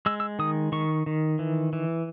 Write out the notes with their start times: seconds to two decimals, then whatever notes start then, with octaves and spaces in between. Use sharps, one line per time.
0.06 G#3 E6
0.20 E6
0.39 D#3 D#6
0.72 D#3 C#6
1.06 D#3
1.39 E3
1.73 E3